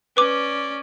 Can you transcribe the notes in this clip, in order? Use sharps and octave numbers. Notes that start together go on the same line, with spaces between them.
C#4 B4 D5 D6